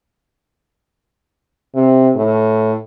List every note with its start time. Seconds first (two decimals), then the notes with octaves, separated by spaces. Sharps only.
1.75 C3
2.16 A2